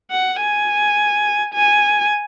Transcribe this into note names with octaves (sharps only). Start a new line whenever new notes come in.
F#5
G#5
G#5